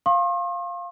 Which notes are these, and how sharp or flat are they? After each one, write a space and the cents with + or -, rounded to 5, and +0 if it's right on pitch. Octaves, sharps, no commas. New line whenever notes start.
F5 +0 C6 +45 D#6 -45